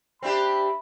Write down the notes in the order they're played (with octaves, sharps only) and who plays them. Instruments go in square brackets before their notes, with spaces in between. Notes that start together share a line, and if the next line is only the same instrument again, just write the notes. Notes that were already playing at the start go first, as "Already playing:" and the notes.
[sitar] C4 D4 G4 [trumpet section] E5 B5